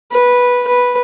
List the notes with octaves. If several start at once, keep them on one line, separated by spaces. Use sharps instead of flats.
B4
B4